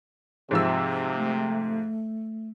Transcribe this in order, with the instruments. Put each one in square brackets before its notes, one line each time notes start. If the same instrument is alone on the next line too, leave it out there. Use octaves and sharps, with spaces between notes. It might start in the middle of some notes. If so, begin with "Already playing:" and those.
[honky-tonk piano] G#2 F3 E6 [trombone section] C3
[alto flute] A3